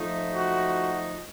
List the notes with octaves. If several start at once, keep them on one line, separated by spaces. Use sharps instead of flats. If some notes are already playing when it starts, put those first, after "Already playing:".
Already playing: F3 A3 D#4
F#4